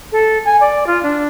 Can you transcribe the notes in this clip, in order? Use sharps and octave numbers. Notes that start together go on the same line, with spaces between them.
A4
G#5
D5
F4
D4